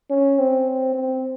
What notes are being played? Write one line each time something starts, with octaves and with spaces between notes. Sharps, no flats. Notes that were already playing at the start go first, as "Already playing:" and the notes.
C#4
C4
C4